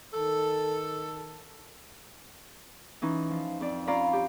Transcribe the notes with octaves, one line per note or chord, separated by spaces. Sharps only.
D#3 A4
E3 C#4 D#4
F3
F2 D5
C#4 F4 D5 F5 A#5 B5
G4